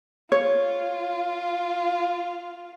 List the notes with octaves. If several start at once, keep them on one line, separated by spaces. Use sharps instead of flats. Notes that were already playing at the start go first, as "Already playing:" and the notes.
F4 C#5